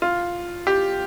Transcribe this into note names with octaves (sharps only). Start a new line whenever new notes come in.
F4
G4